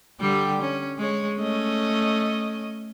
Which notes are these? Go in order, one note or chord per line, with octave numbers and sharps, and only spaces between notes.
D3 G3 G4
C#4
G#3 C#5
A3 C#4 D#5